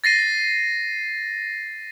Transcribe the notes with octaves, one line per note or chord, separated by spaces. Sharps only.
A6 A#6 C7 D#7